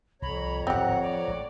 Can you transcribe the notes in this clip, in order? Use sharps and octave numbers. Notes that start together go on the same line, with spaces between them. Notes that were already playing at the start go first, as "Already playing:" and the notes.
C2 F2 C#5 A#5 B5
D1 G#1 F3 C4 G4 F#5
F3 D5
A1 G#3